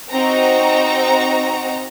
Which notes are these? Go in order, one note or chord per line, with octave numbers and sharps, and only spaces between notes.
C4 D#4 F#4 A#5